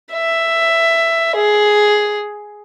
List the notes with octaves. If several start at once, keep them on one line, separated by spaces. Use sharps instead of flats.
E5
G#4